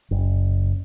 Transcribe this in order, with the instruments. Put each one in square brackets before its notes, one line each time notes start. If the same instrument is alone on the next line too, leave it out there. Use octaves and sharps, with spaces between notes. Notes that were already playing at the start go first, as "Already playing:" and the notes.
[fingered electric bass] F#1